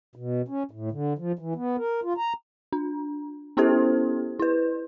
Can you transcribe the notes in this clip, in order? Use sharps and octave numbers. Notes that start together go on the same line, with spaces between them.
B2
C#4
A2
D3
F3
E3
B3
A#4
F4
A#5
D4
B3 C#4 E4 G4 A4 C5
E4 B4